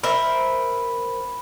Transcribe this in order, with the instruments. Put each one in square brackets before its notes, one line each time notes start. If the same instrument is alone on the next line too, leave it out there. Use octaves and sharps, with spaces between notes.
[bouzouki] A#4 C5 E5 [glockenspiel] B5